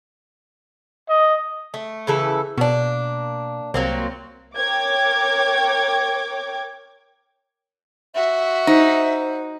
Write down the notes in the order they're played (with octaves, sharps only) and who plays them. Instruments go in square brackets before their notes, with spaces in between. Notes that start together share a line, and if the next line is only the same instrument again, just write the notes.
[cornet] D#5
[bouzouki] A3
C#3 E3 A4
[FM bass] B2 [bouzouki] A#3 D4
[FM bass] C2 [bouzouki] F#3 A#3 C4
[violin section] A#4 C#5 G5 D6 G#6
[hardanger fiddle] F#4 [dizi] E5
[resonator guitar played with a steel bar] D#4 [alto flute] C5